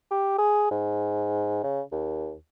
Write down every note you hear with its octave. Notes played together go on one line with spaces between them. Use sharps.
G4
G#4
G#2
C#3
D#2